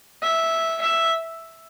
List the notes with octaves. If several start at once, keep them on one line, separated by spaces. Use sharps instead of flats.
E5
E5